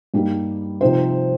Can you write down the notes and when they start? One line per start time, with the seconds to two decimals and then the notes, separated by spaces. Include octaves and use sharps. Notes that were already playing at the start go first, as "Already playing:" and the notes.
0.14 G2 G3 A#3 D#4 G4
0.81 C3 F3 C4 D#4 C5